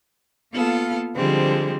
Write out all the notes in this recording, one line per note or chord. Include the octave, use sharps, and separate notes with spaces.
A#3 B3 F4 A4 F5
D3 F3 G3 G#3 C4